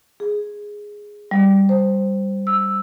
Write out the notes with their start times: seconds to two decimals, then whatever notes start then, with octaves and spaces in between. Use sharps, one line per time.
0.20 G#4
1.31 G3
1.69 C5
2.47 E6